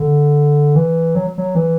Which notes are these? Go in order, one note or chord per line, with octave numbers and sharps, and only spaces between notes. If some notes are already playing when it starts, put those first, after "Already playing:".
Already playing: D3
E3
F#3
F#3
E3